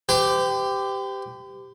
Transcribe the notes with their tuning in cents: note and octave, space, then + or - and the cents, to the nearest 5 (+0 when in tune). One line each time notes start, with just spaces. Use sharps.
G4 +0 C5 -45